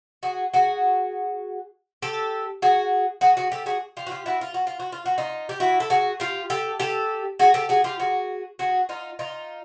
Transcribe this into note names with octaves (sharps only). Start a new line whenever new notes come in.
F#4 G#4
F#4 G#4
G4 A4
F#4 G#4
F#4 G#4
F#4 G#4
G4 A4
F#4 G#4
F4 G4
F#4
F4 G4
E4 F#4
F4
F#4
F4
F#4
F4
F#4
D#4 F4
G4
E4 F#4
A4
F#4 G#4
F4 G4
G4 A4
G4 A4
F#4 G#4
G4 A4
F#4 G#4
F4 G4
F#4 G#4
F#4 G#4
D#4 F4
D#4 F4